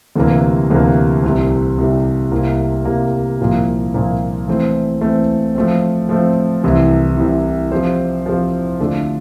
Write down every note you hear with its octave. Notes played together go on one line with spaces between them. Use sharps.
D2 C3 E3 G3 A#3
D2 C3 E3 G3 A#3
C2 C3 G3
C2 C3 G3
C2 C3 G3 A#3
C2 C3 G3 A#3
C2 A#2 F3 A#3
C2 A#2 F3 A#3
E3 A3 C4
E3 A3 C4
F3 A3 C4
F3 A3 C4
C2 C3 E3
C2 C3 E3
F3 C4 G4 C5
F3 C4 G4 C5
D3 A3 D4 F4 A4